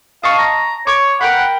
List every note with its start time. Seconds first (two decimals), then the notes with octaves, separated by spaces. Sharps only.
0.23 D#5 F5 A5 C#6
0.39 A#5
0.87 C#5 C#6 D6
1.21 A#4 F#5 G5 B5